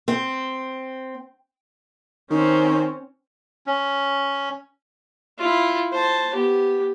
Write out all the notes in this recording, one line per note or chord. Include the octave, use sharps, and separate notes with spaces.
C4
D#3 C4 C#4
C#4
E4 F4
C5 A5
B3 G4